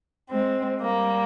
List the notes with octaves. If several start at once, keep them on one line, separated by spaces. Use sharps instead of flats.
G#3 C4
G3 A#3